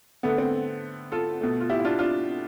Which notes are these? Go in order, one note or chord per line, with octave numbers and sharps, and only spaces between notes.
D3 A3 B3
C4
F4 A4
B2 A3
F4
E4 G4
E4
D4 F4
D4 F4